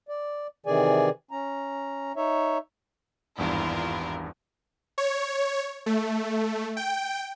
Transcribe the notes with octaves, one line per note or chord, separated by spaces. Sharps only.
D5
C3 D#3 E3 G#4 D5 G#5
C#4 A#5
D#4 C#5 E5
G#1 E2 G2 E4 F4 A#4
C#5
A3
G5